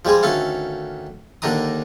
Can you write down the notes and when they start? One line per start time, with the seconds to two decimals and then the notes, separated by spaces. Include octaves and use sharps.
0.05 F3 G3 G#3 G#4
0.23 D2 D#3 C#4 A4 F5
1.42 D#2 D3 D#3 D4 A#5 D#6